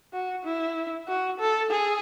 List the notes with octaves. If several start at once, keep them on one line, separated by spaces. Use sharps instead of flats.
F#4
E4
F#4
A4
G#4